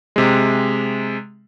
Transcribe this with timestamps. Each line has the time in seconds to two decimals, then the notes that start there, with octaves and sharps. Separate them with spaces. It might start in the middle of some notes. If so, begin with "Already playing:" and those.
0.16 C3 G#3